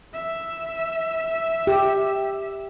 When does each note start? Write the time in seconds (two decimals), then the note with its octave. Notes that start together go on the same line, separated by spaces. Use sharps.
0.13 E5
1.67 G4